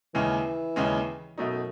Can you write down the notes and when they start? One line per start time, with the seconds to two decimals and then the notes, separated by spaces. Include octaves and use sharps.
0.14 D#2 C#3 E3 G#3 C#4
0.76 D#2 C#3 G#3 C#4
1.38 F#2 B2 A3 D#4